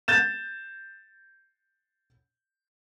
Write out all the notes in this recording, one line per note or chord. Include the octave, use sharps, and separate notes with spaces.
G6 A6 E7